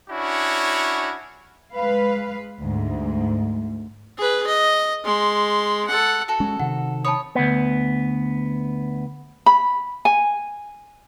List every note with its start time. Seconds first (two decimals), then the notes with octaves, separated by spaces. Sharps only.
0.10 C#4 D4 E4 F#4 C#5
1.77 G#3 B4 F5
2.60 D2 G#2
4.18 G#4 B4
4.47 D#5
5.04 G#3 C6
5.87 A4 F#5
6.28 F#4 A4
6.40 G#3 C#4
6.60 C3 D#3 F#5
7.05 C#5 A5 B5 D#6
7.35 D2 B3
9.46 B5
10.05 G#5